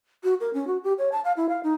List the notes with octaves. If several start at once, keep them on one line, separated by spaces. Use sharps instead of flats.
F#4
A#4
C#4
F#4
G4
C#5
A5
F5
E4
F5
D#4